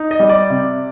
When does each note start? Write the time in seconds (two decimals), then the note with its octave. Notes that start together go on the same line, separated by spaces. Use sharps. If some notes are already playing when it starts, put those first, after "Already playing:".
Already playing: D#4
0.11 D#5
0.20 G3
0.29 D5
0.50 C3